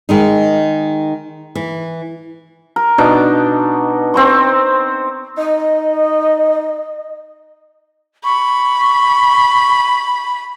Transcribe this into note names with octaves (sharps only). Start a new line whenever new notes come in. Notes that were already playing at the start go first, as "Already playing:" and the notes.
D#3 G#3 D#4
E3
A#4
B2 D4 D#4 D6
C4 C6 C#6
D#4 D#5
B5 C#6